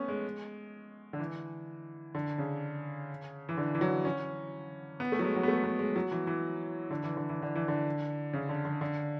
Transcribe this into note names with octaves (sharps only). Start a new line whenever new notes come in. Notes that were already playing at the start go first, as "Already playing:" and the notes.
Already playing: A3 B3 C#4
G#3
D3
E3
D3
C#3
E3
D3
E3
F#3
C#4
B3
A3
F#3
G#3
F#3
B3
A3
B3
G#3
F#3
E3
E3
D3
E3
D3
E3
D3
E3
D3
C#3
D3
D3
D3